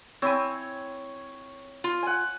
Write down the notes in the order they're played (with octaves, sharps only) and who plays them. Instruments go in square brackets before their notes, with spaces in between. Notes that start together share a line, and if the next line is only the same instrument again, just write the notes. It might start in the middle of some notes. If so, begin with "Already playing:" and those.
[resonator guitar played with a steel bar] C4 E4 G#5 [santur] C#5
[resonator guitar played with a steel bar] F4
[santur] F#5 G#5